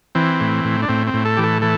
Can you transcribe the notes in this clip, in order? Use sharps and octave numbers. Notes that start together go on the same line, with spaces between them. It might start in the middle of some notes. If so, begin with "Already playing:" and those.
E3 C4
A2
A2
D4
A2 C4
C4
A2
A4
E3 G4
A4
E3 A4